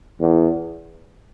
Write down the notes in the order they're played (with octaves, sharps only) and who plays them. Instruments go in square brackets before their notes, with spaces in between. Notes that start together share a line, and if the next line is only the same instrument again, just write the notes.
[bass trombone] E2